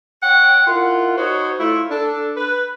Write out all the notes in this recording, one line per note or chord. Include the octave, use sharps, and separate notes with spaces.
C#5 F#5 G5
E4 F4 A#4 F#5
D#4 F#4 C5 C#5
A3 E4 F4
D4 A4
B4